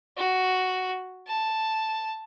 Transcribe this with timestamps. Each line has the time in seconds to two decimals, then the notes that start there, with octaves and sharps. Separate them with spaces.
0.17 F#4
1.27 A5